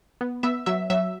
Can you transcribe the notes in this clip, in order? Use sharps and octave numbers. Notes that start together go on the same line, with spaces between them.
B3
B3 E5
F#3 E5
F#3 E5